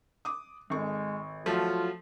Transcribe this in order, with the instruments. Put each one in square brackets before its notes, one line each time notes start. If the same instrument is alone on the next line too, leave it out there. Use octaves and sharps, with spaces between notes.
[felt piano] D6 D#6
[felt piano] G#1 A4 C#6 [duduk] G#3
[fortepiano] F3 A3 [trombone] F#3 [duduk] F4